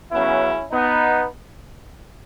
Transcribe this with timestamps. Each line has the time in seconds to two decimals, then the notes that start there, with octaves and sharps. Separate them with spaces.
0.11 C#3 F#3 B3 C#4 E4
0.71 B3 D#4